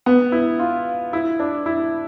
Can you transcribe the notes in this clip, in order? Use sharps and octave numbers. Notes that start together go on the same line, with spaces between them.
B3
E4
F4
E4
D4
E4